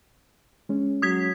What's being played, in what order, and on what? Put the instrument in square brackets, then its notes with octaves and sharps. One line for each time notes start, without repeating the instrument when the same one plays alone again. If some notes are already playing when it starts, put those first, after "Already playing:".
[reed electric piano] G#3 C#4
[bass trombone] F#3 [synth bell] D#6 G#6 B6